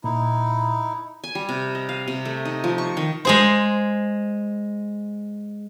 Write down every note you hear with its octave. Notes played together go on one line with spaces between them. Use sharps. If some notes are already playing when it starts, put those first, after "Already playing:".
A#2 D#4 E4
G#5
G3
C3
D#5
F5
C3
A3
D#4
F3
C#6
D#3
G#3 G#4 C5